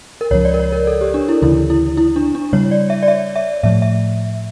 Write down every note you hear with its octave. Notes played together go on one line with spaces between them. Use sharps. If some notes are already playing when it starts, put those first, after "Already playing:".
A#4
C#2 C#3 F3 C#5
D5
A#4
C#5
A#4
A4
G4
D4
E4
D2 C#3 E3 E4
E4
E4
D4
D4
C#3 G3 D4 C#5
D5
E5
D5
E5
E5
A2 F3 A3 E5
E5